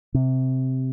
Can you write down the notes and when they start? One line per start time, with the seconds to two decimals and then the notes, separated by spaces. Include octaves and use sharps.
0.14 C3